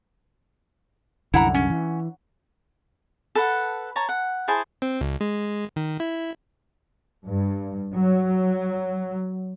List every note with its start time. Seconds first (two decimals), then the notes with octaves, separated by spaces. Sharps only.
1.34 C2 F#2 D3 E4 F#5 A#5
1.54 C#4
1.70 E3
3.35 A4 B4 F#5
3.96 C#5 A5 A#5
4.09 F#5
4.48 E4 G#4 C5 A5
4.82 C4
5.01 C#2
5.21 G#3
5.76 D#3
6.00 E4
7.26 G2
7.93 F#3